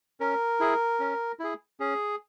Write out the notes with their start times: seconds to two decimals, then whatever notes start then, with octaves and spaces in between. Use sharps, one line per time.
0.20 C#4 A#4
0.60 E4 G#4
1.00 C#4
1.39 E4 G#4
1.80 C#4 G#4